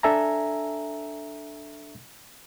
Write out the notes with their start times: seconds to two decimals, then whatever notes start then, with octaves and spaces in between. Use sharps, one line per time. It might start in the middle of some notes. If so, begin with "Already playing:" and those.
0.03 D4 A4 E5 G#5 A#5